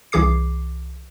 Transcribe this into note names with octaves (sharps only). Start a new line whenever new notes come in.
C2 E3 G#4 D6 C7